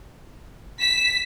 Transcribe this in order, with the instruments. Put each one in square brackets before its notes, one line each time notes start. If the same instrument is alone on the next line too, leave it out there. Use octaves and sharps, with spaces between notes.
[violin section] B6 [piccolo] E7